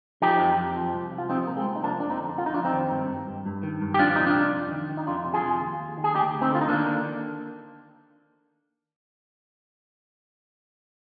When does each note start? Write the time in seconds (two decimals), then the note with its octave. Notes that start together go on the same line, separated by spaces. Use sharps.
0.22 F3 D#4 G4
0.39 F2
0.57 F2
0.76 F3
0.94 C2
1.12 F3
1.18 F4
1.29 C3 C4 D#4
1.47 C2 A#3
1.57 G#3 C4
1.65 C2
1.76 D#4
1.83 F3 A#3 D4
2.00 F2 D4
2.10 C4 D#4
2.19 D3
2.37 F2 F4
2.46 D#4
2.54 F2 D4 F4
2.65 C4 D#4
2.73 D#3
2.91 G2
3.09 G2
3.27 G2
3.46 G2
3.63 D#3
3.82 G2
3.94 G4
3.99 F3 D4 F4
4.16 C2 D#4
4.26 D4 F4
4.35 C2
4.54 F2
4.71 D#3
4.90 D#3
4.97 D#4
5.07 F2 D4 F4
5.25 C3
5.34 F4 G#4
5.43 F2
5.61 D#2
5.79 D#2
5.98 D#3
6.04 G#4
6.14 D2 D#4 G4
6.32 D2
6.42 C4 D#4
6.51 D3 F4
6.61 D#4
6.68 D#3 A#3 D4
6.87 D#3